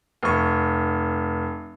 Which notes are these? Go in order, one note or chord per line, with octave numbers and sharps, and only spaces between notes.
F1 C#6